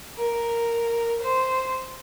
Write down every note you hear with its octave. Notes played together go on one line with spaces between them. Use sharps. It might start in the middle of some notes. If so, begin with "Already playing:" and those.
A#4
C5